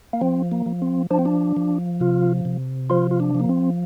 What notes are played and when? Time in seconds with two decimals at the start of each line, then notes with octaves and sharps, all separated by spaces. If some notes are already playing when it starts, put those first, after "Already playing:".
0.13 A#3
0.21 F3 C4
0.52 A#3
0.66 F3
0.82 C4
1.11 F3 D4
1.19 C4
1.25 D4
1.57 F3
2.00 C3 F4
2.45 C3
2.90 F3 F4
3.11 F4
3.20 D4
3.35 F3 A#3
3.49 C4